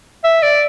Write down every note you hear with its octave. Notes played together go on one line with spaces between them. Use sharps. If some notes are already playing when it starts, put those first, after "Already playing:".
E5
D5